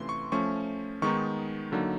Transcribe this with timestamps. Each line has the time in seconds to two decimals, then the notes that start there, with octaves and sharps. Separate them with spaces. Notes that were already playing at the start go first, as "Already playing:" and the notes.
Already playing: C3 E3 A3 C#4 F4 C6
0.09 C#6
0.32 F3 A3 C#4 C#6
1.02 D#3 G#3 B3 D#4 C#6
1.72 D3 F#3 A#3 D#4